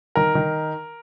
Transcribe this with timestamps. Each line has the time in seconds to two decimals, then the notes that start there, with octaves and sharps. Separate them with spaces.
0.15 D#3 A#4
0.35 D#3